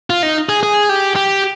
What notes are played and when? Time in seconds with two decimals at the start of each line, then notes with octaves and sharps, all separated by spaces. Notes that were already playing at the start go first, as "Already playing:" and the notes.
0.10 F4
0.23 D#4
0.49 G#4
0.63 G#4
0.89 G4
1.16 G4